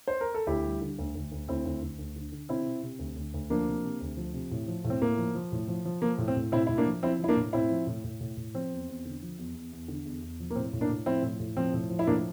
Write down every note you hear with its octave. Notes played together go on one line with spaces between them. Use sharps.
C5
A#4
A4
D2 E4 G4
G3
D3
D2
D2
D2
D2 C4 E4
D2
D2
D2
D3
D3
C3 C4 E4
C3
C3
D2
D2
D2
F3 A#3 D4
C3
C3
D2
F3
C3
A2
F3
A2
C4
A2 A#3
F3
F3
A2
F3
F3
F3 A#3
A2
C4
A2
A2 C4 E4
A2 E4
A#3 D4
F3
F3 C4 E4
F3 E4
A#3 D4
A2
A2 C4 E4
F3
A2
A2
A2
A2
F3 C4
E2
E2
D3
F3
E2
E2
E2
D3
E2
E2
F3
A#3
A2 C4
A2
A#3 D4
A2
F3 C4 E4
A2
A2
F3 C4
A2
F3
E4
A2 A#3 D4